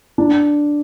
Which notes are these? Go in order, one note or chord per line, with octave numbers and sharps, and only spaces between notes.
D4